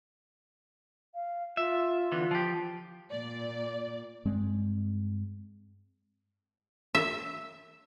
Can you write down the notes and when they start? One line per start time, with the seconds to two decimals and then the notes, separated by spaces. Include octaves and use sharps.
1.15 F5
1.57 F4 E5
2.12 D3 E3 B3
2.31 F3 G4
3.11 A#2 D5
4.25 G2 G#3 C4
6.95 E5